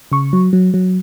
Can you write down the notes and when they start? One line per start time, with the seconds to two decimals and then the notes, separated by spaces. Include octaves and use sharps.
0.12 C#3 C#6
0.33 F#3
0.53 F#3
0.74 F#3